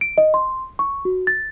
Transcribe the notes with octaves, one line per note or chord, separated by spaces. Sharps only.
D7
D#5
C6
C#6
F#4
A6